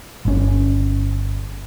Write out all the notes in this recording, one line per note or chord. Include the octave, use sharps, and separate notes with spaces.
G1 C#4